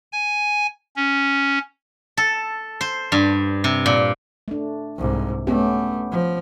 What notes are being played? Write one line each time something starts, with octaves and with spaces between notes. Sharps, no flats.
G#5
C#4
A4
C5
G2
C3
A#2
A3 D4
C2 G#2
A3 B3 C#4 G4
F3